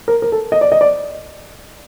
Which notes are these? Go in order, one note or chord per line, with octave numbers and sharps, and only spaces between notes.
A#4
A#4
A4
D#5
D5
D#5
D5